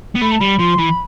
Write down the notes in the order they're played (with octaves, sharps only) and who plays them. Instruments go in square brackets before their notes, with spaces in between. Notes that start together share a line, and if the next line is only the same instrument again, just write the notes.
[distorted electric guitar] B3
[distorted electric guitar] A3 [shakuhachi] B5
[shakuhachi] A5
[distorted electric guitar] G3 [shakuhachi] B5
[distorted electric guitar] F3 [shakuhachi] C6
[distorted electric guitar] E3 [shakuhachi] B5